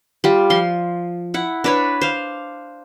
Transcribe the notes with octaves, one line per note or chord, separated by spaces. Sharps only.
G3 F4
F3 C6
E4 F#5
D4 B4 C#5
C5 F5